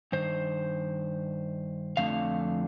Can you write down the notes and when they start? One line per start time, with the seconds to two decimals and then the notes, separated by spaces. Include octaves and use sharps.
0.12 G2 D#3 C5
1.97 F2 D3 F3 A3 F5